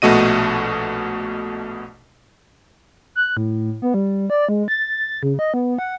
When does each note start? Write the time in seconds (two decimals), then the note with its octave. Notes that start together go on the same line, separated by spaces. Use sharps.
0.02 A#1 B2 A3 F#4 D#5 D#7
3.15 F#6
3.37 A2
3.82 B3
3.94 G3
4.30 D5
4.49 G#3
4.68 A6
5.23 C#3
5.39 D#5
5.54 B3
5.78 F#5